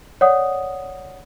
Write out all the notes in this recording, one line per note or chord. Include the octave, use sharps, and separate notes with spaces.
C#5 D5 F#5 D#6